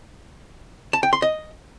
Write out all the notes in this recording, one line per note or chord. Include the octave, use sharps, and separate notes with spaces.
A5
G5
C6
D#5